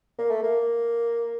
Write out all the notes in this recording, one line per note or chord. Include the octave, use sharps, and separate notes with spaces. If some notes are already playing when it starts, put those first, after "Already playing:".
A#3
A3
A#3